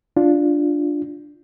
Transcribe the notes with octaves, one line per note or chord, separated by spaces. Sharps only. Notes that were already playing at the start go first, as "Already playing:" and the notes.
D4 F4